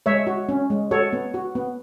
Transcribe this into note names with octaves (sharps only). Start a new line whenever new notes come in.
G#3 C#5 E5
F#4
C#4
G#3
F#4 A4 C#5
B3
F#4
B3